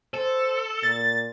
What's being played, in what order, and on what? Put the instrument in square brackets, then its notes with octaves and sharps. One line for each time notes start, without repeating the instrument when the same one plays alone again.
[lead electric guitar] A4 [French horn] C5
[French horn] A#2 [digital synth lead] A6